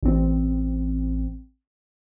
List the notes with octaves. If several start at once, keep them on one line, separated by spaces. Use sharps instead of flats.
A1 C4